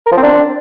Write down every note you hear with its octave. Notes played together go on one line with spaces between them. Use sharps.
A#4
F3
C4
D4